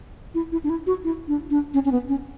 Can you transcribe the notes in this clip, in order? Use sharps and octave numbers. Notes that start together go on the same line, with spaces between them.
E4
E4
D4
E4
F#4
E4
D4
D4
C#4
C#4
B3
C#4